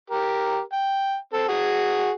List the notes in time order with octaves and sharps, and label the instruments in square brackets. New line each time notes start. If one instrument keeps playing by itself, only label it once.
[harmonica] G4 A#4
G5
C4 A4
F#4 G#4